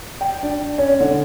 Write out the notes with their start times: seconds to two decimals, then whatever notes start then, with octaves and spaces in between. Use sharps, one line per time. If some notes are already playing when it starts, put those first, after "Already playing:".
0.21 G5
0.43 D4
0.78 C#4
1.00 D3